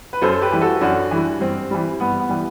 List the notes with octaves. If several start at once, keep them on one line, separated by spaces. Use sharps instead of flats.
B4
F#2 A4 C5
A4
G4 B4
E3 G3
F#4 A4
F#2 D4 F#4
E3 G3
G2 C4
E3 G3
G2 B3
B3
E3 G3